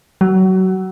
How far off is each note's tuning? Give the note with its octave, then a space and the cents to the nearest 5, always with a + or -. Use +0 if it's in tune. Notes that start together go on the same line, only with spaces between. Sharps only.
F#3 +25